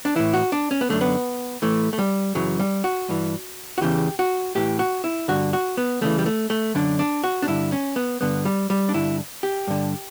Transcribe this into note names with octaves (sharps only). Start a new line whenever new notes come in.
D4
A2 E3 E4
F#4
D4
C#4
B3
F#2 D3 A3
B3
A2 E3 A3
A3
G3
F#2 C#3 E3 F#3
G3
F#4
G2 E3
F#4
E2 C#3 E3 G4
F#4
A2 E3 G4
F#4
E4
G2 D3 F#4
F#4
B3
E2 C#3 E3 A3
G3
A3
A3
F#2 D3 D4
D4
F#4
D4
G2 D3 E4
C#4
B3
G2 D3 B3
G3
G3
D4
G2 D3 E4
G4
G2 D3